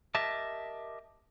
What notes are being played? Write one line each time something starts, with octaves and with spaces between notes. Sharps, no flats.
G4 A#4 D#5 E5 A5